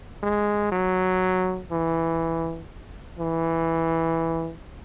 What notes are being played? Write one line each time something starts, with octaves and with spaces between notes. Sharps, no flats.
G#3
F#3
E3
E3